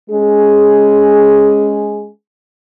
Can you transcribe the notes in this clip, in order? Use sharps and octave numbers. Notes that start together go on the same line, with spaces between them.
G#3 C#4 G#4